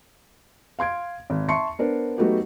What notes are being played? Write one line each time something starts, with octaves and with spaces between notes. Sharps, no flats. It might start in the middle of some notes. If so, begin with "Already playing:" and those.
F5 C6 G#6 D7
G#1
E5 A5 C6 C#6 C7 C#7
B3 D4 A#4 C5
F#3 A3 B3 D#4 F#4 G4